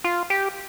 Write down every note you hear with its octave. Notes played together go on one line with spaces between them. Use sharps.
F4
G4